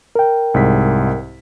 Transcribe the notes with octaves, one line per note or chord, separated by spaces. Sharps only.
A#4 G5
C2 G#2 B6